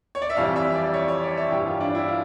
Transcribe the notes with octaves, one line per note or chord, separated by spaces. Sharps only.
C#5
D5
E5
F2 E3 G3 F5
E5
D5
C#5
C#5
D5
E5
G2 E3 G3 G4
F4
D4
E4
F4